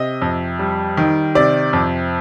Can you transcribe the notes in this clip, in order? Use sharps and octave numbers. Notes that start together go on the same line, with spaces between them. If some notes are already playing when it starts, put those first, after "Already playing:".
Already playing: C3 D#5
F2
G3
D#3
C3 D5
F2